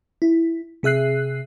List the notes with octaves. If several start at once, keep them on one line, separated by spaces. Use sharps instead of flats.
E4
C3 G#4 E5 F#6 C7